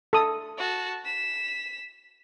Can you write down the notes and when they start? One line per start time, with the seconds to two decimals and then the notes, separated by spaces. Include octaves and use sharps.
0.13 A4 D#6
0.58 F#4 A5
1.05 B6 E7